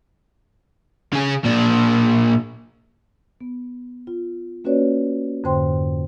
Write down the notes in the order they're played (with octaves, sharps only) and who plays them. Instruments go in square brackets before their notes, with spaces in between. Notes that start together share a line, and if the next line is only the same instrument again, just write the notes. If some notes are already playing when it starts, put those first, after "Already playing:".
[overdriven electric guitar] C#3 G#4
A#2 D4
[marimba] B3
F4
A#3 C#4 F#4 B4 C#5 D5
F2 G#2 D3 C5 G5 C6